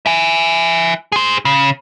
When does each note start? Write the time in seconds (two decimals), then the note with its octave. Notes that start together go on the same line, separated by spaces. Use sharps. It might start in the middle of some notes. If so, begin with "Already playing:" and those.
0.06 E5 G#5
1.12 G#4 C5
1.45 C#3